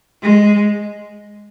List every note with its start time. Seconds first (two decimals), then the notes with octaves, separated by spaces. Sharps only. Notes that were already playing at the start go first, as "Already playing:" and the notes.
0.23 G#3